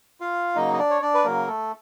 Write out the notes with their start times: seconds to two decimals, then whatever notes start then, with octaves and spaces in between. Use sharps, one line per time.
0.21 F4 F5
0.55 C#3 F#3 A#3 D#4 D#5
0.73 D#5
0.79 D4 D5
0.90 C#5
1.02 D4 D5
1.14 B4
1.24 C#3 F#3 A#3 A#4
1.48 A3 A4